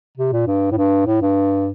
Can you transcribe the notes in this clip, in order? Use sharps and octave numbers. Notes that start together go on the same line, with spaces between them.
C3
A#2
G2
A2
G2
A2
G2